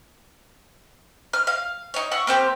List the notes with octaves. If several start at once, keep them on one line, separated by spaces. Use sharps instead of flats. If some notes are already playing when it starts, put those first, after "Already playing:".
F6
F5
D#4 C#5
E4 F#5 C#6
A#3 C4 G4